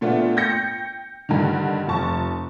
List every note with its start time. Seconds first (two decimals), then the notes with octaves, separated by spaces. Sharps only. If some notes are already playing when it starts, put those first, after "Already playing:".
0.01 A#2 A3 B3 D4 F4
0.36 G5 G6 A#6 C#7
1.29 G2 D3 D#3
1.87 F1 F3 A5 C#6